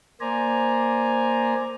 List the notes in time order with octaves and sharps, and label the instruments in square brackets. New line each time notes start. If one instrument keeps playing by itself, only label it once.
[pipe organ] A#3 C5 D5 G#5 A#5